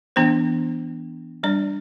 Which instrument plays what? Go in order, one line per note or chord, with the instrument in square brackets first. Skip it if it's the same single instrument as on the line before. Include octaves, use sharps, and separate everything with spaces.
[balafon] E3 B3 D4 C5
G3 D4 D5